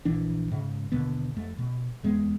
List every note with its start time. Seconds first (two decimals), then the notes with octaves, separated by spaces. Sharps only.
0.05 A#1 E3 D4
0.51 G#2 C#3
0.92 D#2 B2 D3 B3
1.36 F2 A3
1.58 B2
2.03 D1 E2 G#3 B3